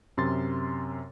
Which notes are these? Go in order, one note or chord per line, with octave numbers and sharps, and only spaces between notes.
F#2 C3 C6 A6